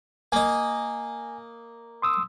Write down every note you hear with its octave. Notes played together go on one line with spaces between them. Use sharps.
A#3 D#5 G#5
C6 D#6 E6